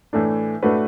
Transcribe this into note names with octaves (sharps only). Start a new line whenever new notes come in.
A2 E3 A3 D4
A2 A3 D4 F#4 B4